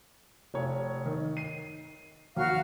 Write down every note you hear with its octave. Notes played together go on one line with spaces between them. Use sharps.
F1 C#5
D#3
C7 D#7
D#2 F#4 F5 F6